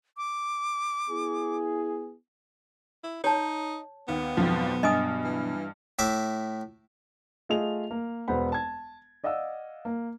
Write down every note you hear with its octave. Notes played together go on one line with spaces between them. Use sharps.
D6
B3 E4 G#4
E4
D#4 C#5 A5
D#2 B3
G#1 F2 B2 F3 F#3
G2 D#5 G#5 D#6
E3
A2 E5 D6
A3 F4 G#4 D#5 F7
A#3
E1 B3 C5 F#5 B5
A5 G#6
D5 D#5 F5 F#5 E6
A#3